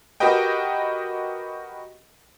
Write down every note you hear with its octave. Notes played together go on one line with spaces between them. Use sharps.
F#4 G4 A#4 B4 D#5 G5